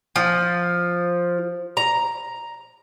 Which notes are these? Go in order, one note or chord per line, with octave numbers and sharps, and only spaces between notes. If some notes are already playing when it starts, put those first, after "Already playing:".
F3
A#5